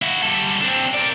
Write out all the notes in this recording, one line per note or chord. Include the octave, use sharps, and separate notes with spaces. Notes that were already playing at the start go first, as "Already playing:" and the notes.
E4 F#4
G3 A4
C4 D4
A#4 D5